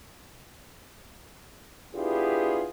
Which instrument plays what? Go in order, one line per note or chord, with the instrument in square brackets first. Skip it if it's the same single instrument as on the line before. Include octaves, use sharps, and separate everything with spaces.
[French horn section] B3 D4 E4 F4 G4 G#4